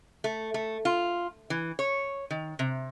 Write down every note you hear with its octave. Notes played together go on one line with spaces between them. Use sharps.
A3
A3
F4
E3
C#5
D#3
C3